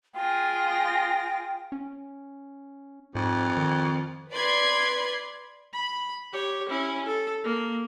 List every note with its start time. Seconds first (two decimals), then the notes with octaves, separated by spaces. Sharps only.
0.15 F4 G#4 G5 A#6
1.72 C#4
3.15 F2 G#2
3.57 D#3
4.32 B4 D5 B5 C6 G#6
5.73 B5
6.33 G4 C#5
6.69 C#4 E4
7.06 A4
7.44 A#3